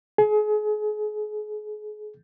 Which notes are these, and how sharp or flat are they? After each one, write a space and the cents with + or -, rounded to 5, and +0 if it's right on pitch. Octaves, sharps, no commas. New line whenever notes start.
G#4 +35